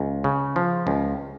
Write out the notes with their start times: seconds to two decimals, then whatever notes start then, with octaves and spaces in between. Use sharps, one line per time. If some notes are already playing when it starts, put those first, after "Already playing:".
Already playing: C#2
0.24 C#3
0.56 F3
0.87 C#2